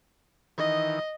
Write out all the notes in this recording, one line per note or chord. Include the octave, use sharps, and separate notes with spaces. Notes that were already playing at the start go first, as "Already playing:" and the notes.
D#3 E3 D#5